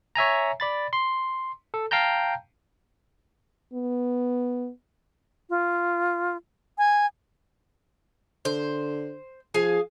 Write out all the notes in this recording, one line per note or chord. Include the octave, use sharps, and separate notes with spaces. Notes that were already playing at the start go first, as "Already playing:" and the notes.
C#5 E5 G#5 A#5
D5 B5 A6
C6
A4
F5 G5 A5 A#5 G6
B3
F4
G#5
D3 C5
F3 G#4 F5 G#5